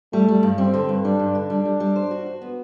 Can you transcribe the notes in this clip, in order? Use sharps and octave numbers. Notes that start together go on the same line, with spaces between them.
G3 A3
G3
G2
G3 C4
D3
G2
G3 D4
G2
D3
G3 D4
G3
G3
C5
F#4
F#4
B3